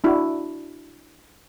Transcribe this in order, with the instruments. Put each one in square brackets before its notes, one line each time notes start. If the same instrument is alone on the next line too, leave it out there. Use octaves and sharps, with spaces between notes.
[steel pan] D4 E4 F#4